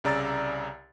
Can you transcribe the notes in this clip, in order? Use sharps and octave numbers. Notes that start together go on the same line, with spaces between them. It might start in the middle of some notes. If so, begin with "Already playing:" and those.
C2 C#3 D5 A#5 E6 A6